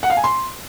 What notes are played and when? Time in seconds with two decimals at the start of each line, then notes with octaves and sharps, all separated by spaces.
0.03 F#5
0.10 F5
0.17 G#5
0.24 C6